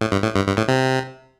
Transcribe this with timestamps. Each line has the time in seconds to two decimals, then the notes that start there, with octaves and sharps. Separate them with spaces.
0.01 A2
0.12 G2
0.23 A2
0.36 G2
0.46 G2
0.57 A2
0.68 C3